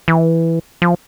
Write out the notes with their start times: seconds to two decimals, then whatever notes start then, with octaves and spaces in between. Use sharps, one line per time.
0.08 E3
0.82 F3